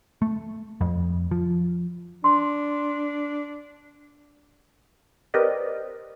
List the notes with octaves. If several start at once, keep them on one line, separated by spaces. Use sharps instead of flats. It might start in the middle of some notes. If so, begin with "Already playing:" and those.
A3
F2
F3
D4 C6
C4 G4 A#4 B4 D5 D#5